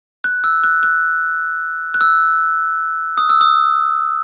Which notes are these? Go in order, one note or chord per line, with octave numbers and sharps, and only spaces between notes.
F#6
E6
F#6
F#6
F#6
E6
D#6
E6
D#6